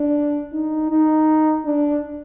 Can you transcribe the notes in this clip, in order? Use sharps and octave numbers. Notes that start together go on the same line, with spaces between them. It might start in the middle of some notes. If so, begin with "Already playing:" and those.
Already playing: D4
D#4
D#4
D4